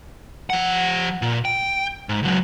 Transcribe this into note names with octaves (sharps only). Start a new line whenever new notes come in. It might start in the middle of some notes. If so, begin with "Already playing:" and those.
F3 F#5
A#2
G5
G#2
C#2 F#3